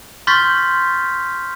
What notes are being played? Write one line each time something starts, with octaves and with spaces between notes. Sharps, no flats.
C6 C#6 F6 G6 A6 B6